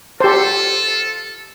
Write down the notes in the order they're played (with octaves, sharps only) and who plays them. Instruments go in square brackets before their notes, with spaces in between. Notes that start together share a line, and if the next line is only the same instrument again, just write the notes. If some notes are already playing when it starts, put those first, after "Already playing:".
[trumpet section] F4 A4 [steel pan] G4 C5